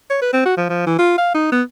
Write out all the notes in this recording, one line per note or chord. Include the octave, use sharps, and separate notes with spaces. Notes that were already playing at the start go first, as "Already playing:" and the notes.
C#5
B4
C4
F#4
F3
F3
E3
F4
F5
D#4
B3